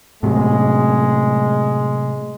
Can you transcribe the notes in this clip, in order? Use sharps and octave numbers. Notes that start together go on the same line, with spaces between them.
A2 C3 F#3 G#3